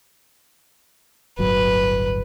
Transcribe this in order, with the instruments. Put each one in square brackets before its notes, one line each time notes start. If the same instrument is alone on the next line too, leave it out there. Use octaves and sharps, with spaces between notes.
[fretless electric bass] D1 G1 F#3 [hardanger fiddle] B4